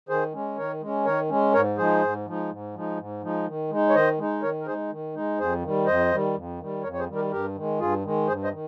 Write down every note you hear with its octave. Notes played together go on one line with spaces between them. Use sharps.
D#3 G#4 C5
G#3 C#4
D#3 A#4 C#5
G#3 C#4
D#3 A#4 C#5
G#3 C#4
G#2 A#4 C#5
F3 G#3 D#4 G#4 C5
G#2
F3 G#3 D#4
G#2
F3 G#3 D#4
G#2
F3 G#3 D#4
D#3
G#3 D#4
C#5
D#3 C5 D#5
G#3 D#4
D#3 A#4 C#5
A#4
G#3 D#4 G#4 C5
D#3
G#3 D#4
F2 G#4 C5
D#3 G3
F2 C5 D#5
D#3 G3
F2
D#3 G3
F2 A#4 C#5
C#5
G#4 C5
D#3 G3
G4 A#4
G2 G4 A#4
D#3 G#3
G2 F4 G#4
D#3 G#3
G2 G#4 C5
C5 D#5
D#3